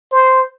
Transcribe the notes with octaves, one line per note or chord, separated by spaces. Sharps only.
C5